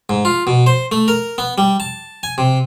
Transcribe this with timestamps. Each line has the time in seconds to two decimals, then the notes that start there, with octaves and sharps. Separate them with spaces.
0.09 G#2
0.25 F4
0.47 B2
0.66 C5
0.92 A3
1.08 A#4
1.38 B3
1.58 G3
1.80 A5
2.23 G#5
2.38 C3